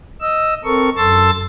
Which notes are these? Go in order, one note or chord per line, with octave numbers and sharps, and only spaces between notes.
D#5 E6
C4 A4 A#4 C#6
F#2 A4 A5 C6 E6 A6